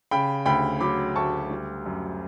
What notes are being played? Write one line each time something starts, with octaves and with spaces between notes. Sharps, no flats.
C#3 G5 B5
D2 G5 B5
F#3 B5 D6
D2 A5 C#6
G3
F#2